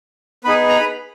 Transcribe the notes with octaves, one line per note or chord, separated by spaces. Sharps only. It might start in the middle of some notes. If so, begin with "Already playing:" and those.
B3 D#4 G#4 B4 B5
A#5
B4 B5